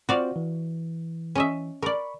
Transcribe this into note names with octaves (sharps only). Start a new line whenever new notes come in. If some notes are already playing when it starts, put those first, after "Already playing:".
C4 F4 F#4 C5 D5 F5
E3
C#4 D#5 E5
A#4 D5 B5 C#6